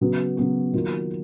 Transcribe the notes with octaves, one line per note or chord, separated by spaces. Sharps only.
C#3 F#3 B3 F#4
C#3 F#3 B3 F#4
D#3 F#3 A#3 F4